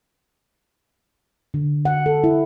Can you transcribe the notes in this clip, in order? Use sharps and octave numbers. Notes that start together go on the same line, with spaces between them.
D3
F#5
A4
E4